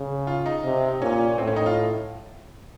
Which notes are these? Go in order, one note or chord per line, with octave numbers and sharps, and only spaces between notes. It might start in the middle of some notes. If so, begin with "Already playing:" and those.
Already playing: C#3
F4
D#4
C3
A#2 C#4
A2 C4
C#4
D#4
F4